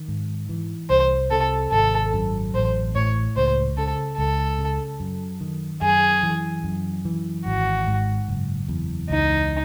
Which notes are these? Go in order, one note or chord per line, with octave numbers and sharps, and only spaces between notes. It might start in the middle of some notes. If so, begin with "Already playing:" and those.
Already playing: D#3
G#2
E3
C2 C5
C3 A4
G#1 A4
F#2
A1 C5
A2 C#5
C#2 C5
C#3 A4
C#2 A4
C#3
F#2
D#3
F#2 G#4
E3
F#2
E3
G#1 F#4
G#2
F#1
E2
C#2 D#4